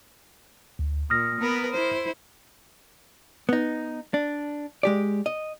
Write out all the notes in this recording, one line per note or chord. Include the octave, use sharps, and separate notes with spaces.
D2
A#2 D#6 F6 A#6
B3 A#4 B4
E4 C5
B3 D#4
D4
G#3 G4 D5
D#5